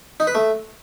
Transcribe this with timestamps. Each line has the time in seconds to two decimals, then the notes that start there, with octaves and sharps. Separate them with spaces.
0.20 D#4
0.27 B4
0.35 A3